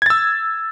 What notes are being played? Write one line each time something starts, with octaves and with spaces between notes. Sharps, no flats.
E6 G#6 A6